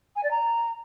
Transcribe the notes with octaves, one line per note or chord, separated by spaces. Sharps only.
G#5
D5
A#5